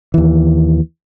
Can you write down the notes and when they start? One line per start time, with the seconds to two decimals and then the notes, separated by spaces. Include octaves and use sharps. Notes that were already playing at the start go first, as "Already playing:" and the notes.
0.14 D#2 E3